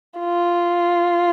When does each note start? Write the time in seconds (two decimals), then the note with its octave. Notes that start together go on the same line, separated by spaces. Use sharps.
0.20 F4